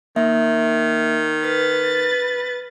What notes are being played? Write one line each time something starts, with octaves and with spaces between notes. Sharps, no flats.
D#3 A#3 E5
B4 F6 A6